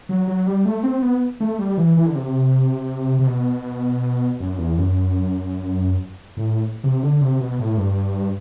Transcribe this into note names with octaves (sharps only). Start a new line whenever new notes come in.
F#3
F#3
G3
A3
C4
B3
A3
G3
E3
E3
D3
C3
C3
B2
F#2
E2
F#2
A2
C3
D3
C3
B2
A2
G2